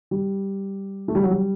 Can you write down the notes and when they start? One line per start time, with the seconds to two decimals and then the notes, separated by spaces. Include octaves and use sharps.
0.11 G3
1.08 A3
1.15 G3
1.23 F#3
1.31 G3